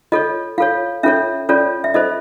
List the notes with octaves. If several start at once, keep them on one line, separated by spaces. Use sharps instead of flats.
F4 A4 C#5 D#5
F4 A4 C#5 F5
C#4 F4 A4 C#5 E5
C#4 F4 A4 C#5 D5
E5
F4 A4 C5 D#5